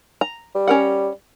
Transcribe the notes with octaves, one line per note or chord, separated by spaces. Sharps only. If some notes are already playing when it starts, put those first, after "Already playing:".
A#5
G3
C#4 A#4 F#5